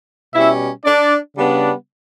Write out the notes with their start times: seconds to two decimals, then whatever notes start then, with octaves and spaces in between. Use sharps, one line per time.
0.34 B2 G3 C#4 E4 E5
0.85 D4 D5
1.36 C#3 G3 B3 D4